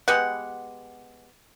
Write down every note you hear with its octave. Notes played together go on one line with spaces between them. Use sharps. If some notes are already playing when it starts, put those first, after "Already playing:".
G#3 B3 G4 F#5